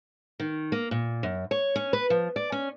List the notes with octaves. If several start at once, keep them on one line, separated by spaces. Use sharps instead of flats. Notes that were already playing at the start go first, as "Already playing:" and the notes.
D#3
A#3
A#2
F#2
C#5
C#4
B4
F3
D5
C#4